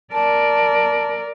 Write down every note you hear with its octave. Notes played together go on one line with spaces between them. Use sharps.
A#4 D5 A5